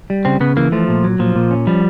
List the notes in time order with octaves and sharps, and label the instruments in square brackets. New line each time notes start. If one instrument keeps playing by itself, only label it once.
[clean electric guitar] G3
[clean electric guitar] C#3 [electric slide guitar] C4
[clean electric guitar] C#3 [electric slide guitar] B3
[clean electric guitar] E3 [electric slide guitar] A#3
[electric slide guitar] F3 [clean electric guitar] A3
[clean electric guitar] A#2
F#3
[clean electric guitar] A#2 [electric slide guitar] F3
[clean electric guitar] A#2
C#4
[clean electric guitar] F3 [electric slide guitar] G3